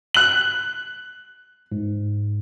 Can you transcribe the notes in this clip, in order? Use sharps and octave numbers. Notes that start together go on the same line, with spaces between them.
F#6 F#7
G#2